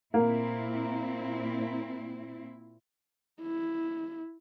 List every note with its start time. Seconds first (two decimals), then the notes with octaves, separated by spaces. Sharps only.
0.14 A#2 A#3 C4 E4
3.42 E4